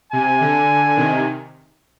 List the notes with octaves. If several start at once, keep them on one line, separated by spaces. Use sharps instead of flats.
C3 G#5
D3
C3 D#3